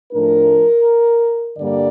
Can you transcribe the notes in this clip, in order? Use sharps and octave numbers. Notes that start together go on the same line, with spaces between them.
A2 F3 A3 D4 A#4
G2 D3 G3 A#3 D5